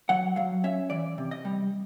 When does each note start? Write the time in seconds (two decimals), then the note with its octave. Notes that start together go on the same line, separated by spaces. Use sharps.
0.09 F#3 F#5
0.36 F#3 F5
0.64 C#4 E5
0.90 E3 D5
1.18 C3
1.31 D#5
1.45 G3